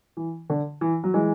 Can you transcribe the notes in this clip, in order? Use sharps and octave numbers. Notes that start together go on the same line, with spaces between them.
E3
D3
E3
F#3
E3 G#3